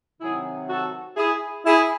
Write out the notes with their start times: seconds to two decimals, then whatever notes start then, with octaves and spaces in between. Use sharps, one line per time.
0.19 C3 D#3 F#3 E4 G#4
0.68 F#4 A4
1.16 E4 G#4
1.65 E4 G#4